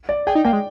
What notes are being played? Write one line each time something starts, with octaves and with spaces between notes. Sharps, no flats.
D5
G#4 G5
D#4
A#3 G5
G#3